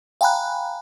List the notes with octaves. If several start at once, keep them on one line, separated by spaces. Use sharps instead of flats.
F5 G5 G#5 A#5 B5 F#6